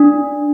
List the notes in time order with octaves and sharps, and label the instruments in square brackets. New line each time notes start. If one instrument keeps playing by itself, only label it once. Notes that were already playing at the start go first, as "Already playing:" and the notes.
Already playing: [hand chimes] D4